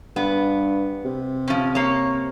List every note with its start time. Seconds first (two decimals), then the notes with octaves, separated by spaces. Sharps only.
0.16 G2 B3
1.05 C3
1.48 F3 C#4
1.75 A#3 C#5